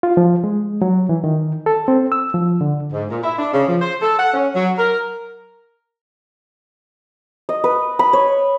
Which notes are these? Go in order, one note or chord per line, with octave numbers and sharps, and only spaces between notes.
F4
F3
G#3
F#3
E3
D#3
A4
C4
E6
F3
D3
G#2
A#2
E4
D4
C#3
F3
C5
A4
F#5
C#4
F#3
A#4
D#5
B4
B5
C#5